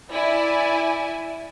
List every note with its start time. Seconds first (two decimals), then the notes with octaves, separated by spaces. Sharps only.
0.12 E4 D5 G#5